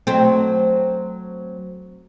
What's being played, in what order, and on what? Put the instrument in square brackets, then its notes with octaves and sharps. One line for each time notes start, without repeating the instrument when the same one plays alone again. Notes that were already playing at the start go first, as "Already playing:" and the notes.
[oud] F#3 A3 C4